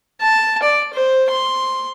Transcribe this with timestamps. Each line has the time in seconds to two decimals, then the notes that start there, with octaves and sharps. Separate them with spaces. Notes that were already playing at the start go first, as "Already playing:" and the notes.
0.21 A5
0.63 D5
0.93 C5
1.30 C6